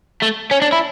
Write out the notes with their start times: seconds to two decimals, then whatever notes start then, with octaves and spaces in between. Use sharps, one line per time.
0.22 A3
0.51 C#4
0.62 D4
0.72 E4